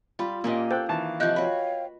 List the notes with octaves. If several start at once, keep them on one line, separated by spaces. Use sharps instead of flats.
G3 F4 B5
A#2 A#3 C#4 G4 D#5 F5
A4 C5 G5 F#6
D#3 E3 A5
C3 F3 D#5 F#6 G6
F#4 B4 C#5 F5 G5 B5